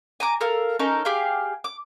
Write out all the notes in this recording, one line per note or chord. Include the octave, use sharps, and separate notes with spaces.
G#5 A#5 D6
A4 A#4 F5 E6
C#4 D#4 A4 A#4
G4 G#4 F5 G5
D6